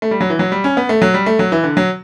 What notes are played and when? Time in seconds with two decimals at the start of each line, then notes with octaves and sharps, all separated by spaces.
0.02 A3
0.11 G3
0.21 F#3
0.30 E3
0.39 F#3
0.52 G3
0.64 C#4
0.77 B3
0.89 A3
1.02 F#3
1.14 G3
1.26 A3
1.39 F#3
1.52 E3
1.64 D3
1.77 F#3